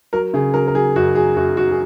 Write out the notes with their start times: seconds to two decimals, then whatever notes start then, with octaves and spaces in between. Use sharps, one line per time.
0.13 F#3 A#4
0.34 C#3 G#4
0.54 F#3 A#4
0.67 A#4
0.75 F#3 G#4
0.96 F#2 F#4
1.15 F#3 G#4
1.36 F#2 F#4
1.57 F#3 F#4
1.71 G#4